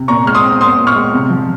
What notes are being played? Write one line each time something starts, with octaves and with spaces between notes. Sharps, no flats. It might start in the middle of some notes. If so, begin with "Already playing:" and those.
Already playing: C3
A#2 A#5 C#6
G#3 F6
C6 D#6
C4
A#2 C6 D#6
A#2
C#6 F6
G#3
C3
F3